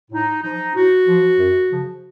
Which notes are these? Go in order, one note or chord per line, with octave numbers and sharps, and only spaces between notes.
A2 D#4
F3 D#4
A2 F#4
F3
F#2
C#3 F3